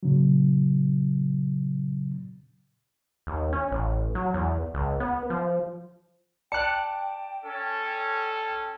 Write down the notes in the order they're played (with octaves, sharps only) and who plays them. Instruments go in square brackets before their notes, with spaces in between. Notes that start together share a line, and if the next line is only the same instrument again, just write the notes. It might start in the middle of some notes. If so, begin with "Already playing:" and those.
[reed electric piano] A#2 C#3 F#3
[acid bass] D#2
C#4
A1
F#3
E2
C#2
B3
F3
[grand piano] D5 A5 [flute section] G5 [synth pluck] F#6 C#7
[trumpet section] C#4 A4